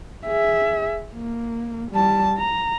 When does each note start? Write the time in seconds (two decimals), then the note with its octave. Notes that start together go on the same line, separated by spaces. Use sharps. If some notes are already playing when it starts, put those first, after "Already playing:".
0.26 G#4 E5
1.14 A#3
1.91 G3 A5
2.38 A#5